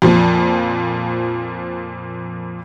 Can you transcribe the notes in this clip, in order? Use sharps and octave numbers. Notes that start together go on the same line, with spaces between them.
F2 A#2 F3